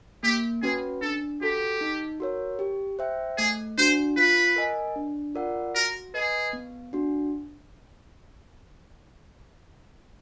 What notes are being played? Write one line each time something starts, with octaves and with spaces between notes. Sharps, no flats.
A#3 G4
C#4 F#4 G#4 B4
D4 A4
F#4 G4 A4
D#4
F#4 A#4 C#5
G4
C5 E5 G5
A3 G#4
D4 F#4 C5
F4 B4
A#4 D#5 G#5
D4
F4 A#4 D5 F#5
F#4 A#4
G#4 B4 D#5
B3
D4 F#4